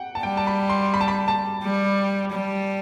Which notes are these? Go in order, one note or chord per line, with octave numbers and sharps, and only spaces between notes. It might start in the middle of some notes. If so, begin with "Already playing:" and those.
Already playing: F#5 G5
A5
G3 G5
A5
B5
C6
B5
A5
B5
A5
G3
G3